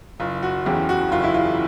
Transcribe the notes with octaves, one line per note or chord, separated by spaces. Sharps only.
F#1 F4
F#4
E2 C#3 E3 G4
F#4
F#1 F4
E4
F4